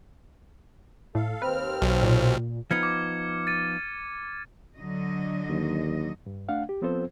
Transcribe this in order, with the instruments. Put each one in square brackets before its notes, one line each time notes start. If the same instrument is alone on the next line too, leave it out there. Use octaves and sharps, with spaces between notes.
[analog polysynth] A2 [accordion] A4 F5
[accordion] D#2 C4 F6 [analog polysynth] B4
[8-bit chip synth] B1
[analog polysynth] A#2
[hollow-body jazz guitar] F3 B3 D#4 [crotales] F6 G#6 C#7
[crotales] D6
A6 D#7
[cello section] D3 F#3 D#5
[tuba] D#2
[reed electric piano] G2
A3 D4 F5 F#5
G4
F3 B3 C4 F4 A4 C5